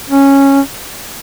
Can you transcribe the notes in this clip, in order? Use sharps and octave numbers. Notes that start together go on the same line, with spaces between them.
C#4